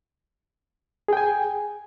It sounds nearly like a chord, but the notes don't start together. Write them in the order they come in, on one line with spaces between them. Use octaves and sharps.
G#4 G5 G#5